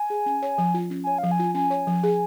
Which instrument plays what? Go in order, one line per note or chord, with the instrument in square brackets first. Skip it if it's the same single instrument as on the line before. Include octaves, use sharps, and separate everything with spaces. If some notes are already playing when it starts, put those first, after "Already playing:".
Already playing: [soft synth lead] G#5
[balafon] G#4
C#4
C#5
F3
F4
C#4
[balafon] C#5 [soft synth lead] G#5
[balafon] F3 [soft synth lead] F5
[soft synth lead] G#5
[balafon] F4
[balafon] C#4 [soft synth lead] G#5
[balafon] C#5
F3
G#4